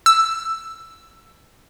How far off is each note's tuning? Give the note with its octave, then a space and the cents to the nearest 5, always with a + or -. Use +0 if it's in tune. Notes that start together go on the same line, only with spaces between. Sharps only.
E6 +5